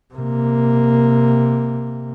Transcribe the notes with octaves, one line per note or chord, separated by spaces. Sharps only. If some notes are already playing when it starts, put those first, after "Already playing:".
C3 A#3